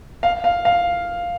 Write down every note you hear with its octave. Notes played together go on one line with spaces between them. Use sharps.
F5
F5
F5